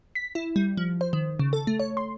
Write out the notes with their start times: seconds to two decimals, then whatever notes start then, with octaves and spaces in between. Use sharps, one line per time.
0.15 B6
0.35 E4
0.56 G3
0.77 F3
1.01 C5
1.13 D#3
1.40 C#3
1.53 A4
1.67 A3
1.80 C#5
1.97 C6